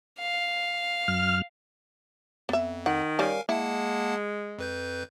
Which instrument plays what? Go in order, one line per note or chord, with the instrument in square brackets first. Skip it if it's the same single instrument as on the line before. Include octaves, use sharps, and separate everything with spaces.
[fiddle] F5
[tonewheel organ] F#2 F6
[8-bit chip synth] F2 [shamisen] B3 E5
[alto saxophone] D#3 [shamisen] F#5
[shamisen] G3 C#4 [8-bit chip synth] A#4 F5 G#5
[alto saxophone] G#3 [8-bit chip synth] A#3 F#5 A5 [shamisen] E4
[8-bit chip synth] F2 B4 G6